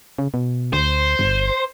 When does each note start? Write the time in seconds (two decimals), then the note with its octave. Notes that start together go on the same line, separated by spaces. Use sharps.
0.18 C#3
0.34 B2
0.73 D2 C5
1.19 G1